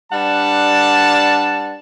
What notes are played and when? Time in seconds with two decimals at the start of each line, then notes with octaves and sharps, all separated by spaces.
0.12 G3 D4 B4 F#5 A5